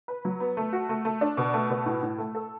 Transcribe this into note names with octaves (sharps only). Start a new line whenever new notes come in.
B4
F#3
B3
A3
F#4
A3
A3
D4
B2
A3
B2
A2
A2
A3
A4